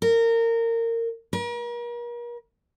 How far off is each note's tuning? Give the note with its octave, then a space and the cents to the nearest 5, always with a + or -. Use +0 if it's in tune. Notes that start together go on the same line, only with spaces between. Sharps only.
A#4 -25
A#4 +40